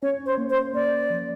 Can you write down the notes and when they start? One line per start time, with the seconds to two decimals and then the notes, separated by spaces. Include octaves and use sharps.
0.02 C#4 C#5
0.26 C5
0.38 A#3
0.50 C5
0.73 A#3 D5
1.10 F3